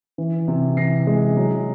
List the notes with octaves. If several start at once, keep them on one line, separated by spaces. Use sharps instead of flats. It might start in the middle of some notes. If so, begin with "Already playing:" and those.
E3
C3
E3 A#6 C7
G#3
F#3